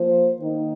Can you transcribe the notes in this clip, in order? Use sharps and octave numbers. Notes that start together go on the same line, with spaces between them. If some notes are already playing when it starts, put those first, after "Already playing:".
Already playing: F3 A#3 F4 C5
D#3 A#3 D#4